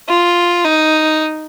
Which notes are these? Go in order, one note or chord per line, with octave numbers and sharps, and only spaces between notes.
F4
D#4